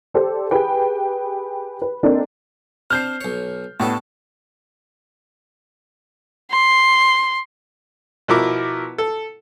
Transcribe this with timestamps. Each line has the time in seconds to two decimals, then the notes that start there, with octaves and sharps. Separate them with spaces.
0.14 G4 A4 C5 D5
0.51 G4 G#4 B4 G5
1.82 B4
2.03 A#3 C4 D4 D#4 A4 A#4
2.90 C4 D4 F6 G6 C7
3.21 B1 C#5
3.80 A2 B3 D4 G4 A4
6.51 C6
8.28 B2 F3 E4 A#4 D6
8.98 A4